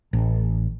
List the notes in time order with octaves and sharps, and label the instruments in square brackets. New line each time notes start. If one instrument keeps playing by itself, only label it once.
[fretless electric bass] A1